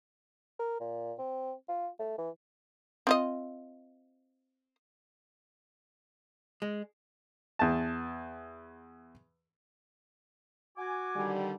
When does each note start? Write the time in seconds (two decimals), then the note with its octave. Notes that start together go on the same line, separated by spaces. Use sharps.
0.59 A#4
0.80 A#2
1.19 C4
1.69 F4
1.99 A3
2.18 E3
3.07 C4 F4 D#5
6.62 G#3
7.59 E2 A5
10.77 F#4 G#5 D6
11.15 D3 D#3 G3